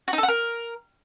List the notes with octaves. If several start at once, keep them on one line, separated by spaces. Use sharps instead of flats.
F#4
D#4
A4
F#5
A#4